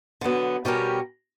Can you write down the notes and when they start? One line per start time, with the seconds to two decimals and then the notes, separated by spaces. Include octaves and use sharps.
0.21 D3 F#3 B3
0.65 B2 G3 C#4 G4 A#4